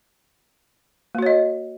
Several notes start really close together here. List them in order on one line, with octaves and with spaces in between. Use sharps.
A#3 F#4 C#5 D#5